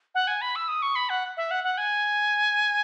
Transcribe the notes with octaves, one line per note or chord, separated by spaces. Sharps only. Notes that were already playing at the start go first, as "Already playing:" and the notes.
F#5
G#5
B5
E6
D#6
C#6
B5
F#5
E5
F#5
F#5
G#5